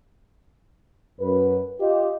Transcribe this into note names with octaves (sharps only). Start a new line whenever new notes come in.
F#2 B4
F4 G4 D#5